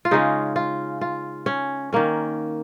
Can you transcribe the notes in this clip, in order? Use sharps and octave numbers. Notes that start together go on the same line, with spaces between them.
F4
C#3 G#3 C#4 D#4
F4
F4
C#4
D#3 A#3 C#4